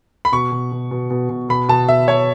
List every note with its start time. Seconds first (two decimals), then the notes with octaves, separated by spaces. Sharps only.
0.25 B5
0.32 B2 C#6
0.52 B2
0.72 B2
0.91 B2
1.10 B2
1.29 B2
1.49 B2 B5
1.68 B2 A5
1.88 B2 E5
2.07 B2 C#5